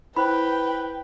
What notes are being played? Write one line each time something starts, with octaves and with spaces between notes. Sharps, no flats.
E4 B4 C5 G5 B5 F#6